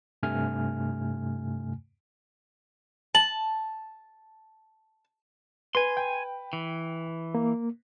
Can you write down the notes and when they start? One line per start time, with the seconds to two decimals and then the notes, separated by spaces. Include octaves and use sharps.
0.23 G2 C3 A3 G#5 F6
3.15 A5 F#7
5.75 B4 G#5 C6
5.97 G5
6.53 E3
7.35 A#3